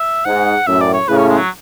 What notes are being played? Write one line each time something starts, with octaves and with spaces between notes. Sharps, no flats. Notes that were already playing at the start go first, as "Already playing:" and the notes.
Already playing: E5
G#2 F#5
F#2 A2 E5
D5
C#5
A2 C#3 B4
C#4
G#3
F#3